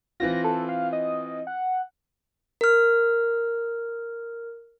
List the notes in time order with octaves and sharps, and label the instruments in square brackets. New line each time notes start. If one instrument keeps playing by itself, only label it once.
[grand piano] E3 C4 F4 [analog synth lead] A#6
[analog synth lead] A4
F5
D#5
F#5
[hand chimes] A#4 F6